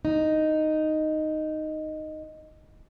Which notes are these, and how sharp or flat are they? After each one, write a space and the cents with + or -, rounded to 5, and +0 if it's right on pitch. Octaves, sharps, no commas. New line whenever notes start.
D#4 -5